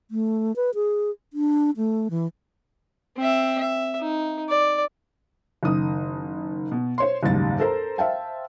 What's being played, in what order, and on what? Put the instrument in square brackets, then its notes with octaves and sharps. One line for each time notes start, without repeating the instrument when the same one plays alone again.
[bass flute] A3
B4
G#4
D4
A3
E3
[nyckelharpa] C4 E5
E5
D#4
D5
[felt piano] F#1 D#3 D#6
B2
C5 C#5 C6
F#1 D#2 G#2 G3 A6
A4 A#4 C5 A#5
C5 E5 F5 G5 A5